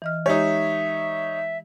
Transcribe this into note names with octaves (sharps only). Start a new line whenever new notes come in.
E3 D#5 F6
G#3 D#4 G4 C#5 E5